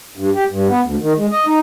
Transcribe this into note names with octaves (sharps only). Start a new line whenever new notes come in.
G2
G4
G2
B3
D2
D#3
G#3
D#5
D#4